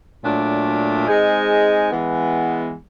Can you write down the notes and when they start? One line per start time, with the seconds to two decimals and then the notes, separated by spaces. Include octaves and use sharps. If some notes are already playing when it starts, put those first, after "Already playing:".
0.24 A#2 F#3 A3 D4
1.07 G#3 C4 D#4 G#4
1.91 E3 G#3 B3